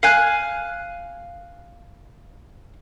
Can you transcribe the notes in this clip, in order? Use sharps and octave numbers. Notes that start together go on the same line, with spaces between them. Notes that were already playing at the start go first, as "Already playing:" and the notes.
F5 G#5 F#6